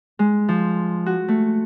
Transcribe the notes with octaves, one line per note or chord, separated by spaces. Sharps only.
G#3
F3
F#4
A3